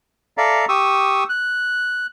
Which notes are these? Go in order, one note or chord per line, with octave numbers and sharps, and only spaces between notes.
A4 D5 E5 F5 A#5
G4 C#6 D#6 E6
F#6